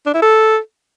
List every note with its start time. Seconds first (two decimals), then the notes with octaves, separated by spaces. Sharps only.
0.06 D4
0.14 E4
0.23 A4